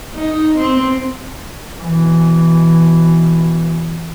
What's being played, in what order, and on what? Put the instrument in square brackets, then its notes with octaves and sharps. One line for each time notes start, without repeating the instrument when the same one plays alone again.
[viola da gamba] D#4
C4
[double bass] B2 E3